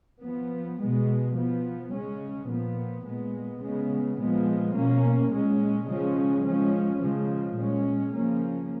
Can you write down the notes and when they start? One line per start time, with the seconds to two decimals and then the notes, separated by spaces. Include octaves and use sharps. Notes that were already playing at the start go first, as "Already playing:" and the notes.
0.23 F3 B3
0.80 B2 G#3 B3
1.36 F3 B3
1.93 C#3 G#3 C#4
2.49 A#2 F3 B3
3.05 A#2 G#3 B3
3.62 C#3 G#3 B3
4.19 A#2 F3 G#3 B3
4.75 B2 A#3 C#4
5.31 A#2 G#3 C#4
5.88 C#3 F3 G#3 C#4
6.44 F3 G#3 C#4
7.01 C#3 F3 G#3
7.57 A#2 G#3 C#4
8.13 C#3 F3 A#3 C#4